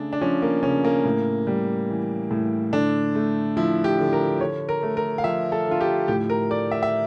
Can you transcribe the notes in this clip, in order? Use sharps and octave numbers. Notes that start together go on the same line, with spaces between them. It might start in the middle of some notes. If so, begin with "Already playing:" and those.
Already playing: C#3 A3 D4
D4
F3 C#4
A#3
C#3 C#4
A#3
A2
G3
E3
A2
D3 D4
A3
F3 E4
G4
D3
A#4
D3 C#5
A#4
A3
A#4
F5
F3 E5
A4
D3 F4
G4
A2 G4
A#4
A3 D5
E5
E5